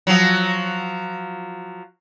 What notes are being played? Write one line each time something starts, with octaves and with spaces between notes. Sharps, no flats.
F3 F#3